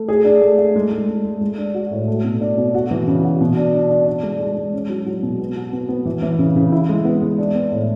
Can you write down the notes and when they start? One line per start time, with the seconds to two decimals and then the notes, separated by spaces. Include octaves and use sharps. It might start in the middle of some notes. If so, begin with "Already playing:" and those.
Already playing: A3
0.08 G#4
0.25 D4
0.41 A3
0.58 A3
0.76 G#3
0.91 G#3
1.09 G#3
1.25 G#3
1.41 G#3
1.58 D4
1.74 F#4
1.91 A2
2.08 A3
2.24 B2
2.41 D4
2.58 B2
2.74 F#4
2.91 E3
3.07 C#3
3.24 F#4
3.41 B2
3.57 D4
3.74 D4
3.90 D4
4.07 D4
4.23 G#3
4.40 G#3
4.57 G#3
4.73 C#4
4.90 F#3
5.06 F#3
5.23 B2
5.40 B3
5.56 F#4
5.73 B3
5.89 B3
6.06 E3
6.22 E3
6.39 C#3
6.56 C#3
6.72 E4
6.89 G#3
7.05 B3
7.21 G#3
7.38 D4
7.55 B3
7.71 A2